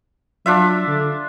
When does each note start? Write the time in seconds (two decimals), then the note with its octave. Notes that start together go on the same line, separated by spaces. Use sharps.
0.46 F#3 D4 F4 E5
0.87 D3